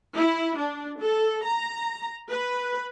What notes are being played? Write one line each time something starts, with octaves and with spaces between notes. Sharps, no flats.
E4
D4
A4
A#5
B4